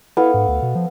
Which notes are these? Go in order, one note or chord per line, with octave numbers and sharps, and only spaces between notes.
B3 E4 A4 F5
G#2
D2
B2
F3